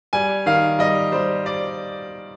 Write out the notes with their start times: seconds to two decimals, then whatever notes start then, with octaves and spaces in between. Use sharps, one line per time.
0.13 G3 G#5
0.46 D#3 F5
0.79 G3 D#5
1.12 G3 C5
1.46 D5